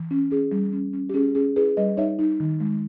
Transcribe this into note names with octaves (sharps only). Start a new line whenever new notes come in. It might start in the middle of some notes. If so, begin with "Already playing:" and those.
Already playing: E3
C#4
C#4 G#4
G3
C#4
C#4
G4
C#4 G#4
C#4 G#4
E4 G#4 B4
G3 B4 D#5
D#4 C#5 E5
D#4
D#3
G#3